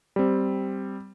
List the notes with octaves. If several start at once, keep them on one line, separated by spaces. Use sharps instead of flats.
G3 C4